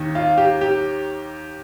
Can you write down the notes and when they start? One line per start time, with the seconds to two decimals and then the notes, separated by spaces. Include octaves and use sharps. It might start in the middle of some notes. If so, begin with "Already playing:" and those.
Already playing: D#2 D#3
0.15 F4
0.38 G4
0.61 G4